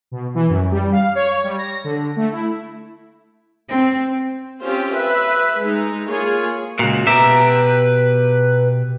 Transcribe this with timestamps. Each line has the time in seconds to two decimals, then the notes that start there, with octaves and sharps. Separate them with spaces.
0.11 B2
0.35 E3
0.49 F#2
0.71 G3
0.92 F5
1.15 C#5
1.44 G3
1.58 A#6
1.84 D3
2.16 A3
2.32 E4
3.69 C4
4.61 C4 C#4 F4 G4 C5
4.92 B4 E5
5.59 G#3 D#4
6.09 A#3 F4 G#4 C#5
6.79 C#2 A#2 F#4
7.07 B2 G4 B4 E5 A#5